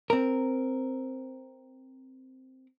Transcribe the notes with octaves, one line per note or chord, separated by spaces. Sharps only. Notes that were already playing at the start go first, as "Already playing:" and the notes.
C4 A#4